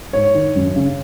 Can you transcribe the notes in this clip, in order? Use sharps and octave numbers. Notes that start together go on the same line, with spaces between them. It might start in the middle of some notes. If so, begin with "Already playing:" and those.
G#2 C#5
D#3
F#2
C#3